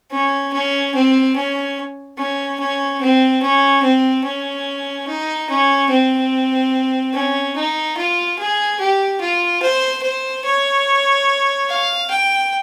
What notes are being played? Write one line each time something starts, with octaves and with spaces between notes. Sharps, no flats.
C#4
C#4
C4
C#4
C#4
C#4
C4
C#4
C4
C#4
D#4
C#4
C4
C#4
D#4
F4
G#4
G4
F4
C5
C5
C#5
F5
G5